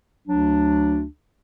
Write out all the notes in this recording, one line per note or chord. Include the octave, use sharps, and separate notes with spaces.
D2 F#3 D4